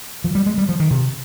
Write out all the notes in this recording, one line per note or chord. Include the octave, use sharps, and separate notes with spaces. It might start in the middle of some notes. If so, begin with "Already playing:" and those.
F3
G3
G#3
G3
F3
D#3
C3